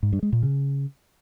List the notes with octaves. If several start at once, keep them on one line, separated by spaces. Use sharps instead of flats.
G#2
G2
G#3
A#2
C#3